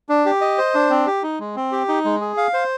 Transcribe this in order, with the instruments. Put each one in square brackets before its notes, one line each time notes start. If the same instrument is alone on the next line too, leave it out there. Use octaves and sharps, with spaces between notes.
[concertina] D4
G4
D#5
C5
D4
C4
G4
D#4
G#3
C4
G4
D#4
G#3
G#4
F5
C5